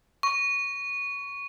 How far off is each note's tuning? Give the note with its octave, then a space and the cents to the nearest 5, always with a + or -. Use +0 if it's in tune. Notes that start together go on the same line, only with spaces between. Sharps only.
C#6 +10